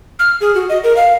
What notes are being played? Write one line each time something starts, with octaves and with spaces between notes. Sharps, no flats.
F6
G#4
F#4
D#5
A#4
F5